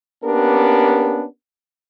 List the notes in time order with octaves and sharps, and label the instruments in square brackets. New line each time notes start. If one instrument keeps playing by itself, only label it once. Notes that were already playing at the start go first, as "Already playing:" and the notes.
[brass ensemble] A#3 B3 C#4 D4 G4 A#4